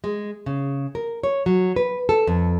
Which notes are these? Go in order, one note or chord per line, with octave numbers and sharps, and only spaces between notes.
G#3
C#3
A#4
C#5
F#3
B4
A4
F2